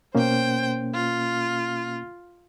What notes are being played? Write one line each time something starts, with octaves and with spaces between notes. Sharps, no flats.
B2 A#3 C#4 C5 G5
F4